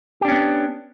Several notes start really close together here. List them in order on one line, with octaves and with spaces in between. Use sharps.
G4 D4 C#4 B3